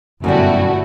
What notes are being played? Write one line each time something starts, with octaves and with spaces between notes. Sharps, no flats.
G1 F#2 B2 G3 A3 E4 F#4